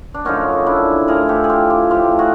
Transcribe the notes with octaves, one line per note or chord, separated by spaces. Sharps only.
D4
F#2 D3 F3 C#4 D#4
D4 E4
A2 F3 G#4 A#4
G4 A4
G#4
F4 G4
F4 G4
A2 F3 F4 G4
F#4 G#4